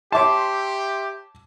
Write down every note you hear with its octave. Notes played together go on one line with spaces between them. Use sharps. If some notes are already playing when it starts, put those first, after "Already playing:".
G4 C#5 E5 A5 C6 D6